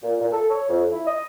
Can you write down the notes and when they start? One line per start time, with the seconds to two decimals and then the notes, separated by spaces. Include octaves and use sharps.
0.03 A#2
0.20 A#2
0.32 A4
0.50 C#5
0.69 F2
0.92 E4
1.06 D#5